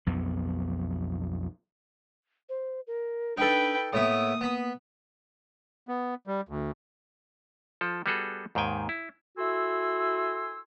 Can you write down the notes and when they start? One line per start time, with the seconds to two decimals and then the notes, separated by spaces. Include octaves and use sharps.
0.06 B1 F2 B3
2.49 C5
2.87 A#4
3.37 D4 D#4 A4 B4 G5
3.93 A2 A#3 B3 E4 D#6
4.41 B3 B5
5.88 B3
6.27 G3
6.49 D2
7.81 F3 A4
8.06 G3 B3 F#4 G#4 A4
8.55 D#2 G#2 D#3 G5 G#5
8.89 E4
9.38 E4 F#4 A4 G#5 C6 E6